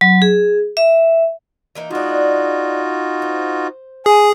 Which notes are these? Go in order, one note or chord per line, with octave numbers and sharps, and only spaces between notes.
F#3
G#4
E5
E3 A#3 D#4
G#3 D4 D#4 F4 F#4
C5
G#4 G#5